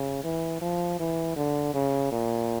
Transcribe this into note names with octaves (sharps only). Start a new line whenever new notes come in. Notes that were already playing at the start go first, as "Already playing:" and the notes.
Already playing: C#3
E3
F3
E3
D3
C#3
A#2